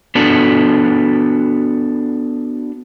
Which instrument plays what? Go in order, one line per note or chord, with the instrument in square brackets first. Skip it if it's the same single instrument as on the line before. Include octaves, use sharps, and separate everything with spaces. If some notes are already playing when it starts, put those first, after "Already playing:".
[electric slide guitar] B3 D4 F#4 A4